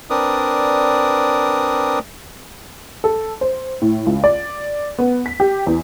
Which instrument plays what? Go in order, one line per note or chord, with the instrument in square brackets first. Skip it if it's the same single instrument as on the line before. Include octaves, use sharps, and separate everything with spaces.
[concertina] C4 D4 A#4 B4 D5 D#6
[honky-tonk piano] A4
C5
A2
C#2
D5
B3
B6
G4
E2